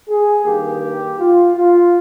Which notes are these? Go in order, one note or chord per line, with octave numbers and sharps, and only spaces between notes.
G#4
G2 D#3 A#3 G4
F4
F4